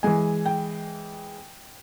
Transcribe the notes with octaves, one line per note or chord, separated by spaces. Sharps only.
E3 G#3 G#5
G5